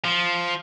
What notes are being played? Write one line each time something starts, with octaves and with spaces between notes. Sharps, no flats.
F3